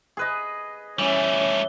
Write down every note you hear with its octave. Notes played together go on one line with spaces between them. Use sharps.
G#4 B4 D#5
E3 G3 A3 C#4